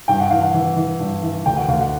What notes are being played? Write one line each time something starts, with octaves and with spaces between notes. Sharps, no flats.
G2 G5
F#5
E3 F5
F#5
E3
E3
G2
E3
D2 G5
F#5
D2 F5
F#5